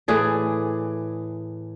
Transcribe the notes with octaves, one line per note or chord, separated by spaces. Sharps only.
A2 E3 G#4 D5